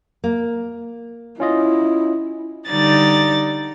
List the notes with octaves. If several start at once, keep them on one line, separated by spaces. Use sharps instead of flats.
A#3
C#4 E4 F4 D#5
D3 G3 D#4 D5 A6